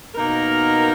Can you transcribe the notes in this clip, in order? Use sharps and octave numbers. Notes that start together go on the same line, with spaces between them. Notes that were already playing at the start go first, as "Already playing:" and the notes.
B2 A#3 D#4 A#4